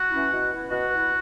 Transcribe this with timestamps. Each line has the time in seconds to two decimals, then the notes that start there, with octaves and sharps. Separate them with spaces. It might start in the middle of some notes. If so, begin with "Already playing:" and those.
Already playing: F#4 F#5
0.10 E3 C#4 E4
0.30 B2
0.50 B3 E4
0.70 B2 F#4 F#5
0.90 B3 E4